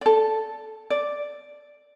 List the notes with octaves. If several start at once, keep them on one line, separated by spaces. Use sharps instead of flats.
A4 D5
D5